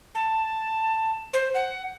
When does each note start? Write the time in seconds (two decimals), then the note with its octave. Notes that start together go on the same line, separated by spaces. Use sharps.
0.15 A5
1.33 C5
1.54 F#5